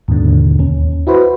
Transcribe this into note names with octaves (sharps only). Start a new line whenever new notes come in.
D#2 G#2 B2 D3
D#2 C#4
E4 F#4 B4 C5